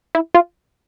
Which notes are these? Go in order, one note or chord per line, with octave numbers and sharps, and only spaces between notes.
E4
F4